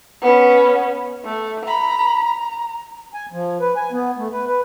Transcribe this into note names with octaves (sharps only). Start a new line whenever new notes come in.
B3 C#4
A3
A#5 B5
A#5
G#5
F3
B4
G#5
B3
A3
B4
B4